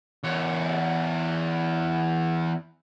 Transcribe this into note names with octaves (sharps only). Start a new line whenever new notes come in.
E2 C#5